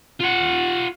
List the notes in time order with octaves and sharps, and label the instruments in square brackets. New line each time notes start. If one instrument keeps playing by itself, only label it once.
[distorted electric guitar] F4 F#5